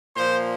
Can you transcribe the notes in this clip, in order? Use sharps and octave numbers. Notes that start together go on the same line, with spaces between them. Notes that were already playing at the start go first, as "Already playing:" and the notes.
A#2 F3 C5